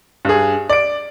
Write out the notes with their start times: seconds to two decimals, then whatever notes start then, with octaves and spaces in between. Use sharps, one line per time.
0.25 G2 G#4
0.69 D5 D7